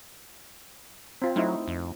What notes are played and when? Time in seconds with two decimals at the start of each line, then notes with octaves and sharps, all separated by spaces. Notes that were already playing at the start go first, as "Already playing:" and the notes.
1.22 C4 F4
1.36 F#3 A3 D#4 E4
1.68 F2